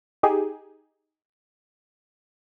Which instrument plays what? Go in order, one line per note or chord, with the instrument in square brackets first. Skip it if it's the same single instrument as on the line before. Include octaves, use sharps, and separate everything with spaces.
[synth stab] D#4 G4 G#4